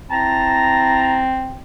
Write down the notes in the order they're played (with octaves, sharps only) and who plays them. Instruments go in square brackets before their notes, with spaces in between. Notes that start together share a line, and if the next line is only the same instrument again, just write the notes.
[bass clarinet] C4 [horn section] E4 A5 A#5